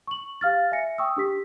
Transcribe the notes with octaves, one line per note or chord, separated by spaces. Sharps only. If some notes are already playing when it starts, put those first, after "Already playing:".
C#6 F#7
G4 F5 F6 A6
E5 G#5 A#6 C#7
G5 C#6 D#6 E6
D4 G4 B6